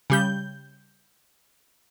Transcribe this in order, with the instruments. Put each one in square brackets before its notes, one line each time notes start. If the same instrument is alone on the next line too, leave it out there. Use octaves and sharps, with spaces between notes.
[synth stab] C#3 G3 G6